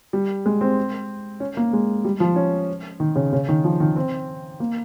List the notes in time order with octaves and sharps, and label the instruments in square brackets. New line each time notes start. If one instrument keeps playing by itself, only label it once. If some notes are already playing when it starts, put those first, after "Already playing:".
[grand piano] G3
G#3
C4
C#4
A#3
G#3
G3
F3
C#4
D#3
C#3
C#3
D#3
F3
D#3
C4
A#3